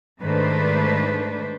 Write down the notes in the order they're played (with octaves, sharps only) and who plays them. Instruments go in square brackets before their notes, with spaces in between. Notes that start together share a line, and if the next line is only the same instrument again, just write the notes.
[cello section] G#2 D#3 A3 D4 B4 C5